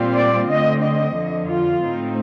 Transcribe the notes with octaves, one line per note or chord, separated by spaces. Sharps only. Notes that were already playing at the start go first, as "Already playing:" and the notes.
Already playing: A#2 G3 C4 F4
D5
D3 A3 C4 D#5
D#5
F2 D3 F3
F4
A2 A3 C4 D#4